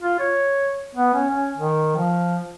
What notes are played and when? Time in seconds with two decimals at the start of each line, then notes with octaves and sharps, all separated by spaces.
0.01 F4
0.19 C#5
0.95 B3
1.14 C#4
1.30 C#4
1.56 D#3
1.96 F3